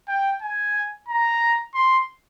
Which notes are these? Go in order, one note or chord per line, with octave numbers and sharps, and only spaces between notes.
G5
G#5
A#5
C6